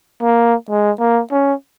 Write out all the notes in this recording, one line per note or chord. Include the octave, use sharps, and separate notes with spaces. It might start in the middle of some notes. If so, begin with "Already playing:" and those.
A#3
G#3
A#3
C#4